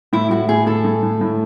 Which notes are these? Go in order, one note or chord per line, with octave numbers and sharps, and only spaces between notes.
A2 E4
A2 F#4
A2 G#4
A2 A4
A2
A2
A2